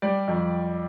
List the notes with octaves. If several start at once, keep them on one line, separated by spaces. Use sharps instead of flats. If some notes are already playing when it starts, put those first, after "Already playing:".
G3 D5
F2